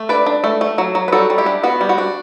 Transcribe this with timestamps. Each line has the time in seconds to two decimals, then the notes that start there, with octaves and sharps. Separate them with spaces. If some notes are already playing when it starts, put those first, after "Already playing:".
Already playing: A3
0.09 D4 B4 D5
0.26 D4
0.44 A3
0.61 A3
0.78 F#3
0.95 F#3
1.08 B4
1.12 G3 F#4 A4
1.30 G3
1.38 E4 G4
1.46 D4
1.63 B3 F#4
1.81 G3
1.89 F#4
1.98 D4